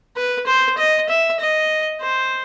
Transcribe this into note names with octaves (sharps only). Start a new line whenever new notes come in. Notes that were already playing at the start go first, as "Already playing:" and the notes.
B4
C5
D#5
E5
D#5
C5